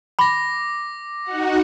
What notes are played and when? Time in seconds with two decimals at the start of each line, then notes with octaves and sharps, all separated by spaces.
0.19 B5 D6 A#6
1.23 D#4 F#4 F#5